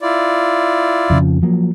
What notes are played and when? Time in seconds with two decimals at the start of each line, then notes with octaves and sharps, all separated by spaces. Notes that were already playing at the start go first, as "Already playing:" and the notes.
0.01 E4 F4 D5
1.10 F2 C#3 F3
1.43 F3 F#3 A#3